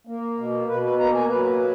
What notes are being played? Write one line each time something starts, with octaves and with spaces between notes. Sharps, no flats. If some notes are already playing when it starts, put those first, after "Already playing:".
A#3
B2
B2 B4
B4
A#3 A#5
G#5
F#3 B4